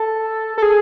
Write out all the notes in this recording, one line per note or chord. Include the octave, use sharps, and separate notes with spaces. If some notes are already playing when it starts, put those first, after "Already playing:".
Already playing: A4
A4
G#4